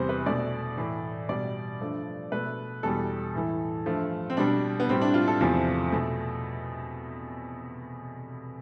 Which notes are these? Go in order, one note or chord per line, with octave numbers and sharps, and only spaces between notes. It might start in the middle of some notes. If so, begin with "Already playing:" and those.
Already playing: E2 C3 G3 C5
B4
B2 A3 D5
A2 E3 A3
B2 G3 D5
G2 F3 A3
B2 A3 B4
E2 B2 G3 A4
A2 E3 A3
G2 F3 A3
C4
B2 G3 D4
B3
A2 G3 C4
D4
F4
A4
E2 C3 F3 A3
B2 A3